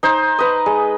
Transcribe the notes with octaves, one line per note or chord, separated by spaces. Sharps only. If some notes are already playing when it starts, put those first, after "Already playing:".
D#4 C5
B4 D#5
G#3